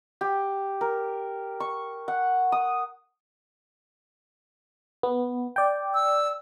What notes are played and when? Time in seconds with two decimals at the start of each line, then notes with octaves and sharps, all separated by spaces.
0.21 G4
0.81 A#4
1.60 C#6
2.08 F#5
2.52 D#6
5.03 B3
5.56 D5 G5
5.94 E6